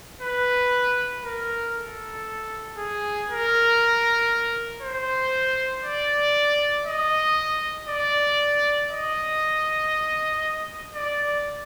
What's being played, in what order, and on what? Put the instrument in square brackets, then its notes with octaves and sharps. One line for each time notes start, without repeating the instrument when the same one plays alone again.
[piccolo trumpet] B4
A#4
A4
G#4
A#4
C5
D5
D#5
D5
D#5
D5